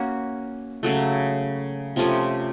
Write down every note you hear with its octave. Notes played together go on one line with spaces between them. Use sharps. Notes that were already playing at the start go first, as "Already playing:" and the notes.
Already playing: A#3 C#4 F#4
C#3 F#3 A3
C3 F3 A3 C#4